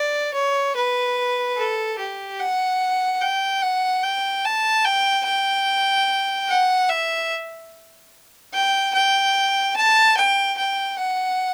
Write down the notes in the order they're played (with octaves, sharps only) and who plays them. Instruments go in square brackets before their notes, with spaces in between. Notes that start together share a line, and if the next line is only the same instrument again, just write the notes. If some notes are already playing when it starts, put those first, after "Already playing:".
Already playing: [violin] D5
C#5
B4
A4
G4
F#5
G5
F#5
G5
A5
G5
G5
F#5
E5
G5
G5
A5
G5
G5
F#5